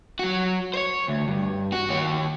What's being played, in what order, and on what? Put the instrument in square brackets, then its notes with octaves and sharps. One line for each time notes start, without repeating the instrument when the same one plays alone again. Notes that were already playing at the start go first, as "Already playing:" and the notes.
[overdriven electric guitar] F#3 F#4
C5 C#5
D2
G2
F#4
D#2 C#5